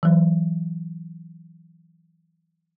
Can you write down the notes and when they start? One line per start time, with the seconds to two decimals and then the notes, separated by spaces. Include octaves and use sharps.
0.03 E3 F#3